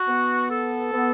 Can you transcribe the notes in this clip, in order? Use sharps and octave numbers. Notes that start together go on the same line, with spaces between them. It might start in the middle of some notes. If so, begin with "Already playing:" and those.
Already playing: F#4
B3
A4
B3